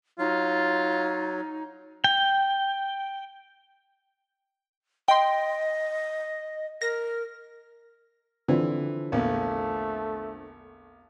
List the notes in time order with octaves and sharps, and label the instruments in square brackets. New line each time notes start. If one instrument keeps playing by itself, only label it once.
[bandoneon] F#3 [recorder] D#4 [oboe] F4
[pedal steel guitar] G5
[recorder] D#5 [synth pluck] G5 C6
[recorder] A#4 [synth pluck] A#6
[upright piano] D3 F3 C4 [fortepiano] E3
[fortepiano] A#1 E2 [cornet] A3